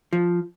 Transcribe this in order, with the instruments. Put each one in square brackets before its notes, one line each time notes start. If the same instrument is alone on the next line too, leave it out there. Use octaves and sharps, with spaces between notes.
[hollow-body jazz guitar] F3